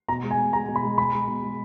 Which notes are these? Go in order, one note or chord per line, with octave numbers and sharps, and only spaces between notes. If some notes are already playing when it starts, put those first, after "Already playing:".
B2 A#5
G#3
G#5
B2
G#3 A#5
B2
B5
G#3
B2 B5
G#3
B2
G#3